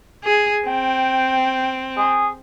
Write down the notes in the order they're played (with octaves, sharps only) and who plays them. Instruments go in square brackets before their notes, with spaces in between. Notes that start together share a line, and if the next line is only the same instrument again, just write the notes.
[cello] G#4
[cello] C4 [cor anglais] G5
[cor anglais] G#4